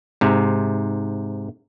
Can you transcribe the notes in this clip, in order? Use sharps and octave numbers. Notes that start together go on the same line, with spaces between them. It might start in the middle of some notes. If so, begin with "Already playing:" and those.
G#2 C3